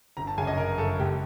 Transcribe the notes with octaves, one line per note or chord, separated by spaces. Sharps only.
G1 A#5
A5
F#2 C#3 G#5
D#5
G1 A#4
F#2 C#3 A4
C#2 G4